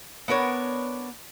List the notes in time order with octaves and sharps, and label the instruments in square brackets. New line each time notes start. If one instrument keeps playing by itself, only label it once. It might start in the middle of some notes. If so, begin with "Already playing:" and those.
[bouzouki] B3 D4 A#4 C#5